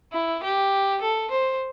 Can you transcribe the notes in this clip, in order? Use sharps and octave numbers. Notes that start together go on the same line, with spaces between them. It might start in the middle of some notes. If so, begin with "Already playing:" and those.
E4
G4
A4
C5